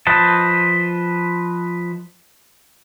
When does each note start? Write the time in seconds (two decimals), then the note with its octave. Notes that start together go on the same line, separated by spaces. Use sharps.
0.07 F3 B4 C5 D#5 A5